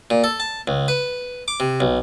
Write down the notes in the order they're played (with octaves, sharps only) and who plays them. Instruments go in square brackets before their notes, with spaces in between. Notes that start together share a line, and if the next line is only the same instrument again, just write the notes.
[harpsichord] A#2
A4
A5
C#2
B4
D6
C3
B1